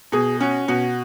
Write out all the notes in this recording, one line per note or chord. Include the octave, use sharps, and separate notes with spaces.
B2 G#4
C#4 F#4
B2 F#4